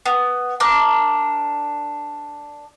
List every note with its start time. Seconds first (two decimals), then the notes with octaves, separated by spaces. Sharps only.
0.06 B3
0.60 D4 A#4 D6 F#6